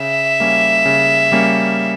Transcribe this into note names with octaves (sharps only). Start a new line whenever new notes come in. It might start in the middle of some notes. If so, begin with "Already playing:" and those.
Already playing: C#3 E5
G3 A#3 C#4
C#3
G3 A#3 C#4